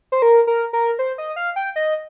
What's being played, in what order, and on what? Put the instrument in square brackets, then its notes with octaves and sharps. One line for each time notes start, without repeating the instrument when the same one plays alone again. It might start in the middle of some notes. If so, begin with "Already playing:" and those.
[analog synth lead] C5
A#4
A#4
A#4
C5
D#5
F5
G5
D#5